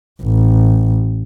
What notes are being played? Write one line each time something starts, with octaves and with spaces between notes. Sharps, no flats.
A1